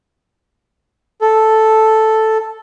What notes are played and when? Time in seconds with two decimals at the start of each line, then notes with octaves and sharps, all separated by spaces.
1.21 A4